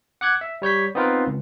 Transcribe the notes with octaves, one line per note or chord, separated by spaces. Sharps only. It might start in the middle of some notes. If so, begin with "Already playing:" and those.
F#5 D6 F#6 G#6
E5
G3 C#5 G6 B6
B3 C4 D#4 F4 A#4 B4
C#2